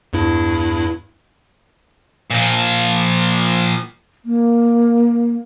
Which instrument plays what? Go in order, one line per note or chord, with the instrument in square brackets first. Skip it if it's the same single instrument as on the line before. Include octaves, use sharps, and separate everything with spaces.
[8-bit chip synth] E2 G2 E4
[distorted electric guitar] A#2 F3
[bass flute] A#3